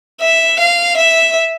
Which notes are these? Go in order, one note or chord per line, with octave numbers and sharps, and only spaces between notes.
E5
F5
E5